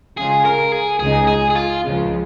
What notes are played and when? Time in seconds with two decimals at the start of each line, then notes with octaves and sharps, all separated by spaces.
0.17 C#3 G#3 F4 G#4
0.45 A#4
0.72 G#4
1.00 C#2 C#3 G#3 D#4 G#4
1.27 G#4
1.50 G#4
1.55 F4
1.83 C#2 C#3 F3 G#3